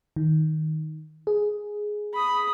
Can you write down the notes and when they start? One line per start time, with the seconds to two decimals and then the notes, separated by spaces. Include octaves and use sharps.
0.16 D#3
1.27 G#4
2.13 B5 D#6